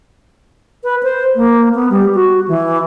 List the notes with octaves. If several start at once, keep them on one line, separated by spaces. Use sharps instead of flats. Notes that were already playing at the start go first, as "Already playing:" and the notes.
B4
C5
A#3
B3
G3
F#4
E3